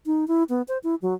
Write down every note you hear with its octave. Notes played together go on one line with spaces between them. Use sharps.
D#4
E4
B3
C5
E4
F#3